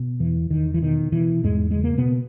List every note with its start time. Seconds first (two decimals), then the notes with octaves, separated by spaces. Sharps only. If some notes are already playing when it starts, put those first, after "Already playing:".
Already playing: B2
0.20 E2 E3
0.50 E2 D#3
0.74 E3
0.82 B2 D#3
1.12 B2 E3
1.43 E2 G#2 G#3
1.71 C#3 G#3
1.84 A#3
1.97 B2 B3